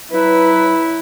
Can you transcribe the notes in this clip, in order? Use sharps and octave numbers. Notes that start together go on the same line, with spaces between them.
F#3 E4 B4